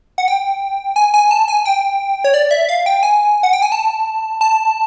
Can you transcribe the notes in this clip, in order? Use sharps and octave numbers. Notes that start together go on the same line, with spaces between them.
F#5
G5
G#5
G#5
A5
G#5
G5
C#5
D5
E5
F5
G5
G#5
F#5
G5
G#5
A5
A5